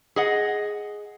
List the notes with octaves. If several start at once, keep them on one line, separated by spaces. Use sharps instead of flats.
G#4 D#5 F#5